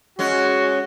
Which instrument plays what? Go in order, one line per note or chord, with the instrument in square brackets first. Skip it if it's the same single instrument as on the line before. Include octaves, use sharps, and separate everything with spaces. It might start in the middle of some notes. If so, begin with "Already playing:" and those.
[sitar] G#3 C#4 [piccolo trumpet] F#4